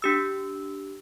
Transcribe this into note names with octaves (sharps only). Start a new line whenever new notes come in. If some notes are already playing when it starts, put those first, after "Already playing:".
D4 G4 E6